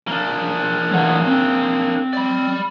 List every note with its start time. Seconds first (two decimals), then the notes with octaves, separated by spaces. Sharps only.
0.07 A#3 D4
0.91 A2 E3 F#5
1.26 C4
2.13 D5 B5